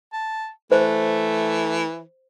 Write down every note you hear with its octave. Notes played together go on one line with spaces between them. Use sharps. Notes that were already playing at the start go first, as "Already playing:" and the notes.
A5
E3 A3 C5